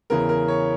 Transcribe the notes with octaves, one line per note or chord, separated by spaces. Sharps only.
E2 C#3 E3 A#4
A#4
C#5